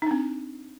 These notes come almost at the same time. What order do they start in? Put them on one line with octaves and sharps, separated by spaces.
D#4 D4 C4